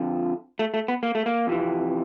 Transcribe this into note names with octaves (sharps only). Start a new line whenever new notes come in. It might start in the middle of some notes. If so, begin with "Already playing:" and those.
Already playing: F2 D3 F3
A3
A3
B3
A#3
A3
A#3
F2 C3 E3